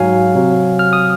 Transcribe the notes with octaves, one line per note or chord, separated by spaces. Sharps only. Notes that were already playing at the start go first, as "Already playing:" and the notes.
Already playing: G#2 F#3 F5 G#5
C3 F#3
F6
D#6